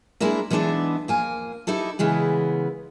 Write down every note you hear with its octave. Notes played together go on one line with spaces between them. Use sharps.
G#3 A#3 D4 E4 A#4
E3 G#3 B3 D4 D#4 E5
F2 A#3 G#5
D#4 E4 G4 A4
C#3 E3 G#3 B3